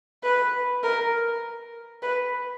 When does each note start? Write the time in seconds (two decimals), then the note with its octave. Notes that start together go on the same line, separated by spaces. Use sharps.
0.23 B4
0.83 A#4
2.02 B4